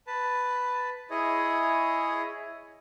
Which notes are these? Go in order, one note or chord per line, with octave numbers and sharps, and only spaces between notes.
B4 A5
E4 G#4 C#5 D#5